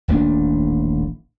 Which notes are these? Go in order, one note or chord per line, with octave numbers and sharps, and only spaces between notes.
D#1 A1 A#3 D4